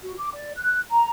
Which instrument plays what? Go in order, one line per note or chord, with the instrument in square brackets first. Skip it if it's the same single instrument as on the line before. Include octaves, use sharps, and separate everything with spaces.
[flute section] F#4
D6
D5
F#6
A#5